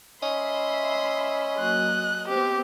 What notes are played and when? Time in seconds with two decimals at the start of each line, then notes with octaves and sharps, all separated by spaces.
0.23 C#4 D#5 E5 B5 C6
1.59 F#3 A#3 F#6
2.28 B3 C4 G4